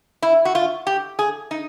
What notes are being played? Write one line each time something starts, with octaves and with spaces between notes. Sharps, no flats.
E4
F#4
F4
G4
G#4
D#4